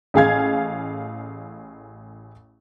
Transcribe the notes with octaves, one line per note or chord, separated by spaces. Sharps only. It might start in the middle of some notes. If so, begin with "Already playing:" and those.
A1 G#4 F5 G#6